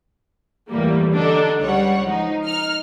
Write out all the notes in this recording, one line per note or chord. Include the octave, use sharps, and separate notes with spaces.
E2 A2 F3 G3 A#3
D3 D4 D#4 A4
C#2 G3 C#5 F#5
F3 D#4
D#4 F6